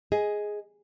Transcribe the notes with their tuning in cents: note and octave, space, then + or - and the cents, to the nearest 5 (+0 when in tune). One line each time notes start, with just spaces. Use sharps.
G#4 +0 D#5 +10